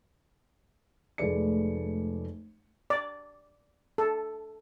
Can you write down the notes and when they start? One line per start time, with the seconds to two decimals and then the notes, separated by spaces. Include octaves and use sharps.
1.18 F1 G#3 A3 B4 D5 C#7
2.90 D5
3.98 A4